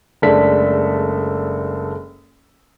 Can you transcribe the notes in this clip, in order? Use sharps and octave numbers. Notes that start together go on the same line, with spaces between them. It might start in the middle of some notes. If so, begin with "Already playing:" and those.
F#1 G#3 A3 D4 A4 B6